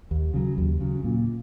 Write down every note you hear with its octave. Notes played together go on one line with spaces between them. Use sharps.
D#2
C#3 F#3
D#2
C#3 F#3
A#2